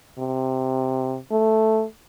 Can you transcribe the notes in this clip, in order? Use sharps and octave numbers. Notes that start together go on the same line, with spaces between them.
C3
A3